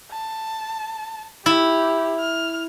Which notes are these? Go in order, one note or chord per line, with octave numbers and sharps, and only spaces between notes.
A5
E4 G4
F6